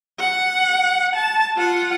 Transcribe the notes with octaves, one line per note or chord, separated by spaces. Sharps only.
F#5
A5
F4 F#5